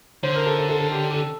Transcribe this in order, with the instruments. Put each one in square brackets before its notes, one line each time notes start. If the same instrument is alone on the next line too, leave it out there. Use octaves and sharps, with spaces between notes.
[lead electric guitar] D3 [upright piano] C5
[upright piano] A#4
A4
A4
A4
A4
G4
G4
A4